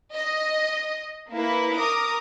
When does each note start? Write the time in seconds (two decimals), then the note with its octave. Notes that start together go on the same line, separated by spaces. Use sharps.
0.13 D#5
1.30 A#3 E4 B4
1.75 A#4 A#5 D6 D#6